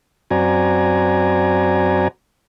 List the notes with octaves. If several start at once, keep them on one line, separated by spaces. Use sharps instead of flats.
F#2 C4 F#4 D5 G#5 A#5